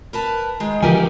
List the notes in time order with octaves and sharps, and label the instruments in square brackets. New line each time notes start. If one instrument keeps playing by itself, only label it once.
[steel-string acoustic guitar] A#4 B4 A5
D#3 G#3
[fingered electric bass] D3 E3 F3 [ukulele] G4 A#4 G#5